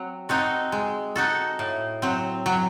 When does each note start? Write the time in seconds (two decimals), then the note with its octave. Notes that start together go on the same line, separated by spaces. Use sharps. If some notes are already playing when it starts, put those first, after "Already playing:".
Already playing: F#3 C4
0.29 C4 D#4 F#4 A4
0.72 G#3
1.16 D#4 F#4 A4
1.59 A2
2.02 F#3 C4
2.46 F#3